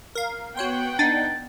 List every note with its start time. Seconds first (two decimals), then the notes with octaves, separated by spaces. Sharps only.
0.15 A#4 F5
0.57 B3 F#4 C#5 F#5 G5 C6
0.99 D4 D#4 A6